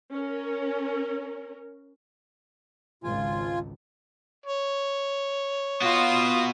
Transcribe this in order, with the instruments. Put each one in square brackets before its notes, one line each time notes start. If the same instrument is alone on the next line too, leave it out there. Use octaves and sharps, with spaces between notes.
[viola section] C#4 A#4
[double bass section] G#1 C#2 [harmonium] F4 G#5
[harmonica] C#5
[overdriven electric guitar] B3 F#4 [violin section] F4 D#6